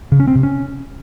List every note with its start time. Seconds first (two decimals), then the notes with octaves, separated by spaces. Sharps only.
0.12 C#3
0.20 C#4
0.28 C4
0.35 C3
0.43 C#4